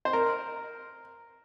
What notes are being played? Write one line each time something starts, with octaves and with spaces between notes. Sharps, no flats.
C5
A#4